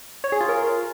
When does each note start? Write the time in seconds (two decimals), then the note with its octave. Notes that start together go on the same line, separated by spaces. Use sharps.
0.24 C#5
0.32 G#4
0.41 F4
0.49 A#4